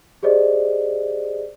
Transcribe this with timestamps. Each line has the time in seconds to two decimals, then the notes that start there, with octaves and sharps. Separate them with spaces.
0.23 G4 G#4 C5 D5 D#5